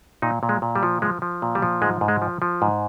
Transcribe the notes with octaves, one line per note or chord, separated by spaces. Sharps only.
A#2 D#4
A#2
G#3
A#2
G3
F3
F3 G#3
F3
A#2
G3
F3
G#2 G#3
G#2
G#3
F3
F3
G#2